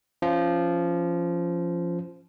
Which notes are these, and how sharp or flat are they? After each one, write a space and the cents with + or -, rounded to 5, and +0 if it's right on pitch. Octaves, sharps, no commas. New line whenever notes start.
F3 -15 C#4 +0